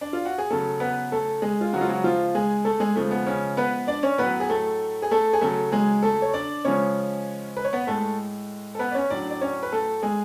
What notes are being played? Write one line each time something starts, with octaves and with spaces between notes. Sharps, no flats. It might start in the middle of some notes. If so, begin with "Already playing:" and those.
D4
F4
F#4
G#4
C#3 F#3 A3 A4
B3 B4
A3 A4
G#3 G#4
F4
C#3 F3 F#3 G#3 F#4
F4
F#3 F#4
F3 F4
G#3 G#4
A3 A4
G#3 G#4
C#3 F3 G#3 A3
B3
C#3 C#4
B3 B4
D4 D5
C#4 C#5
A2 F#3 B3 B4
G#4
A3 A4
G#4
A3 A4
G#4
C#3 F#3 A3 A4
G#3 G#4
A3 A4
C#5
D4 D5
C#3 F3 G#3 C#4 C#5
B4
C#5
B3 B4
A2 G#3 A3 A4
A4
B3 B4
D5
C#4 C#5
A2 F#3 D4 D5
D5
C#4 C#5
B4
A3 A4
G#3 G#4